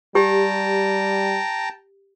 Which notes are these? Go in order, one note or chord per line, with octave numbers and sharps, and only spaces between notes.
G3 G4 G5 A5 A#5